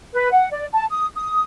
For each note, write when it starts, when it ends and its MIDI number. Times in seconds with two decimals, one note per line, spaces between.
0.14 0.31 71
0.32 0.47 78
0.51 0.66 74
0.73 0.84 81
0.90 1.06 87
1.15 1.44 87